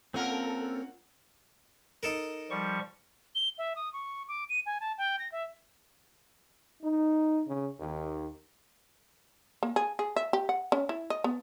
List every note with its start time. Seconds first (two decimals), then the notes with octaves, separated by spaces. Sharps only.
0.14 A#3 C4 C#4 F4 A4 A#4 F#5
2.03 D#4 A4 A#4
2.50 F3 G3 C#6
3.35 G7
3.58 E5
3.76 D#6
3.93 C#6
4.28 D6
4.49 D#7
4.66 G#5
4.80 A5
4.98 G5
5.19 A#6
5.32 E5
6.82 D#4
7.47 C#3
7.80 D#2
9.63 A#3
9.76 G#4
9.99 G#4
10.16 E5
10.33 G4
10.49 F#5
10.72 C#4
10.89 E4
11.10 D#5
11.24 B3